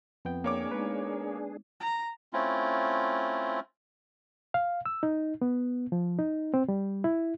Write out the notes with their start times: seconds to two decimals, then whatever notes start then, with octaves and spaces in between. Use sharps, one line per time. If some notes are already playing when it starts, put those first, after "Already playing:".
0.25 F2 B3 C4 G5
0.44 A#3 D4 G#4 C#5 D6
0.71 G#3 B3 D#4 B4
1.80 A#5
2.33 A3 C4 C#4 E4 F4
4.54 F5
4.86 E6
5.03 D#4
5.42 B3
5.92 F3
6.19 D#4
6.54 C4
6.68 G3
7.04 E4